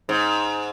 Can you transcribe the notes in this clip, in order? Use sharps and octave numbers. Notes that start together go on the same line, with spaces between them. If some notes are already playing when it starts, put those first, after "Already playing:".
G#2